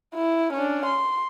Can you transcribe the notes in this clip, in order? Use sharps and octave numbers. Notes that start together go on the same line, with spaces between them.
E4
C#4 D4
C6